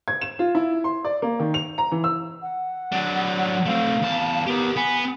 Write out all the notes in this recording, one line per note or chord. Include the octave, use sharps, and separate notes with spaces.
G#6
E7
F4
E4
C6
D5
A#3
D#3
F7
A#5
E3
E6
F#5
F#3 D4
A3 C4 F5
E2 A5
B3 G4 A#4
B3 G#5